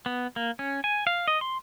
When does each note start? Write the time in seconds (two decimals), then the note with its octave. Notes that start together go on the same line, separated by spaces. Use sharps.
0.06 B3
0.36 A#3
0.59 C#4
0.84 G#5
1.07 F5
1.28 D#5
1.41 C6